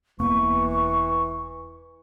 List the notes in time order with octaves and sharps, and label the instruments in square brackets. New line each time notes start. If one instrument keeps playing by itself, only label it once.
[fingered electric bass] E1 A#3 B3 [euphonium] E3 [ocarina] C#6